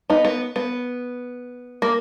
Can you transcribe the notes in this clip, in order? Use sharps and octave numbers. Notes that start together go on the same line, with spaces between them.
B3 D#4
B3
B3
A#3